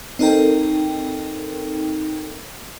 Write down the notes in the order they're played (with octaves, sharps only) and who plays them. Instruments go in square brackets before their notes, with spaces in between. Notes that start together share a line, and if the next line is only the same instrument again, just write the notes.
[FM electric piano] C4 D#4 A4 A#4 G5